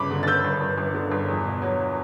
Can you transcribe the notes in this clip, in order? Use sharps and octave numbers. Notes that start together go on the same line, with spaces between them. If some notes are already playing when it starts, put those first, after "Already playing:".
Already playing: G1 C#3 B5 D6
D3
A6
D3 E6 G6
G1
G1
G1
D3
G1
E2
B2
F#3